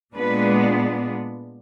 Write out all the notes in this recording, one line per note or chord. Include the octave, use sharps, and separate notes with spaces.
A#2 G#3 B3 D4 B4